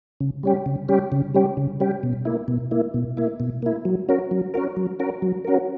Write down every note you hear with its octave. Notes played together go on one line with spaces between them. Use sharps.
C#3
G3 C#4 G4
C#3
G3 C#4 G4
C#3
G3 C#4 G4
C#3
G3 C#4 G4
B2
A#3 E4
B2
A#3 E4
B2
A#3 E4
B2
A#3 E4
F#3
C#4 F#4 A#4
F#3
C#4 F#4 A#4
F#3
C#4 F#4 A#4
F#3
C#4 F#4 A#4